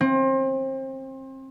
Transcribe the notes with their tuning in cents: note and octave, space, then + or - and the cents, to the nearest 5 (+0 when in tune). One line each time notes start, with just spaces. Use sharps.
C4 +30